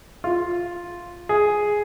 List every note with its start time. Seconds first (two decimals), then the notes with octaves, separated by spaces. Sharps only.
0.24 F4
1.29 G#4